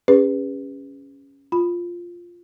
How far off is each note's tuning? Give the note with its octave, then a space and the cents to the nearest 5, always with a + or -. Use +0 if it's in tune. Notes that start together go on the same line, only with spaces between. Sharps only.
C#4 +0 G#4 -45 B4 +0
F4 +0 B5 +0